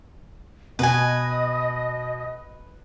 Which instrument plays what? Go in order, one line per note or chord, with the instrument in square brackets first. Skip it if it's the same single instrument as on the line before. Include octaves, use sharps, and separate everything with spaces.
[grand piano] B2 [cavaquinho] B4 G#5 [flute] D#5